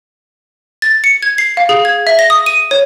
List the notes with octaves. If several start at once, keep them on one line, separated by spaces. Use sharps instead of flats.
A6
C#7
G#6
C7
F5
G#4
G#6
E5
A#6
D#6
D#7
C#5